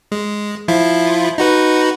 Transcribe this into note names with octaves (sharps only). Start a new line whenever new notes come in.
G#3
F3 E4 F4
D#4 F#4 B4